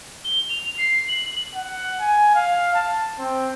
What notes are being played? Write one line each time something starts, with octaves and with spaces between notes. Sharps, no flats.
G7
F7
C7
F#7
F#5
G#5
F5
A5
C4